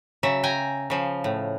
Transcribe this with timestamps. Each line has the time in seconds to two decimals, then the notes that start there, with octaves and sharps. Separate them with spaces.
0.23 C#3 F#3 E5
0.43 G5 G#5 A#5
0.90 C#3 F3
1.24 A2